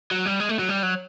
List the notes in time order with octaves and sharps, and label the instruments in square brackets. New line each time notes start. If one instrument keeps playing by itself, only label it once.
[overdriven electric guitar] F#3
G3
G#3
A3
F#3
G3
F#3